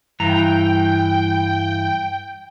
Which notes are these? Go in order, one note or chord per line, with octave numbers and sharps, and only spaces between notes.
G2 E3 G5 A#5